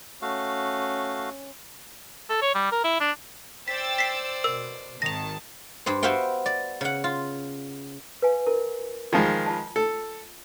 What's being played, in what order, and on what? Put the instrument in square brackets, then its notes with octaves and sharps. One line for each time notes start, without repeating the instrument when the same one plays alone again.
[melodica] A3 F#4 F5 [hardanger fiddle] C#4
[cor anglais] A4
C#5
G3
A#4
E4
D4
[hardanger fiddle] C5 D5 [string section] G5 E6 A6 [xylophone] B6
[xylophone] B6 C7
[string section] B2 [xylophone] A#4 E6
[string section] G#1 D#3 A5 [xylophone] A#6 F7
[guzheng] G2 G4 C5
B3 F#4 C5 E5 F5 G5
D5
C#3 F#5
F4
[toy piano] B4 F5 G#5
E4 A#4
[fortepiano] D#3 F3 G#3 [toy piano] B5
[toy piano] F4 D#5 A5
[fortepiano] A4